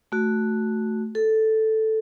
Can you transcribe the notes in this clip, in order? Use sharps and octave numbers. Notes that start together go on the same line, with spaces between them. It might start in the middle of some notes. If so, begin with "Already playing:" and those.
A3 F#4
A4